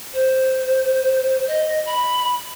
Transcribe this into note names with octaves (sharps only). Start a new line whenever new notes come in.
C5
D#5
B5